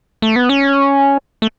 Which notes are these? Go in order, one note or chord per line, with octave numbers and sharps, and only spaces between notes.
A3
B3
C#4
A3